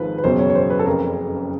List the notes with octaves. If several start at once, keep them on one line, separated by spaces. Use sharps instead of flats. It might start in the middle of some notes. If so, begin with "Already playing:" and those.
Already playing: G#1 G#2 F3 B4
B4
F#1 E2 B2 F#3 C5
C#5
C#5
C5
B4
A4
F#1 F2 C#3 A#4